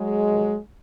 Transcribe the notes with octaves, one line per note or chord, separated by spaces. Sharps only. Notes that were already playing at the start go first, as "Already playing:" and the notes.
Already playing: F#3 G#3
F2 C3 D#3